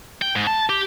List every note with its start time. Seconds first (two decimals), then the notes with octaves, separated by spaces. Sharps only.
0.22 G5
0.36 G#2
0.47 A5
0.69 G4